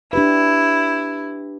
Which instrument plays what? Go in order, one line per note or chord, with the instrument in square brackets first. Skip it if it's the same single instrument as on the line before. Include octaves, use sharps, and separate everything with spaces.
[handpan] D4 G4 B4 [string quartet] E4